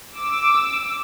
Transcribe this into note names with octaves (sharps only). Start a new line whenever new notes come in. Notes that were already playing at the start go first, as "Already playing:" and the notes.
D6 E6